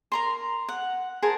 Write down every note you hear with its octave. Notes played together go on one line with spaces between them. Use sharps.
A#4 A#5 C6
F#5
G#4 A#4 C5 A5